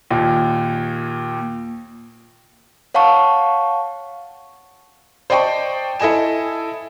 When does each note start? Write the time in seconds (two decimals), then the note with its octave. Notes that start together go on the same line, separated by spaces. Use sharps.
0.11 D#2 A#2
2.94 C#5 F5 F#5 A5 C#6
5.30 C5 D5 D#5 G5 A5 C#6
6.00 E4 A4 D#5 G#5 E7